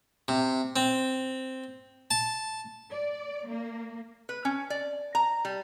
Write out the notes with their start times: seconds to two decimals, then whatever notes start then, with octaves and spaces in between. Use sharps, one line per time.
0.28 C3
0.76 C4
2.11 A5
2.90 D5
3.48 A#3
4.29 B4
4.45 C#4
4.70 D5
5.15 A#5
5.45 G3